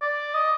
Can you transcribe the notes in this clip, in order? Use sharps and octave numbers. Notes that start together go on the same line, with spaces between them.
D5
D#5